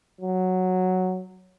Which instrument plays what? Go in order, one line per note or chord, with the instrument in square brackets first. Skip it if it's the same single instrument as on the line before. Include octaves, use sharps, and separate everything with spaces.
[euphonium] F#3